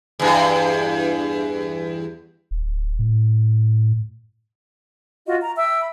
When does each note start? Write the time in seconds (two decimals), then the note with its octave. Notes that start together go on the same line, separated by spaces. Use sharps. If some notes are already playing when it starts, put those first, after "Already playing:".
0.20 E2 G2
2.51 D1
2.99 A2
5.26 F4 F#4 D#5
5.39 A#5
5.57 E5 G5 E6
5.79 B5